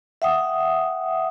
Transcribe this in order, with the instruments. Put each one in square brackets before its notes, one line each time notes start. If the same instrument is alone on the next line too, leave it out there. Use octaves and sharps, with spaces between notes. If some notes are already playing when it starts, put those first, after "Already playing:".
[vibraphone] E5 F#5 G5 D#6